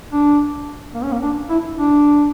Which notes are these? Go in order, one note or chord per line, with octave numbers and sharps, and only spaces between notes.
D4
A#3
C#4
A#3
D4
E4
D4